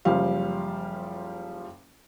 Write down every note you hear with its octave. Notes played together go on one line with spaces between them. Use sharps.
F#1 F3 G3 F5